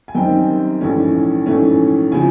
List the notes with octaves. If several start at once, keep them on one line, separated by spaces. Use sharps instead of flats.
G#5
F#2 D#3 G3 C4 D#4 G5
A#1 G#2 E3 A3 C#4
A#1 G#2 E3 A3 C#4
C#3 F3 G#5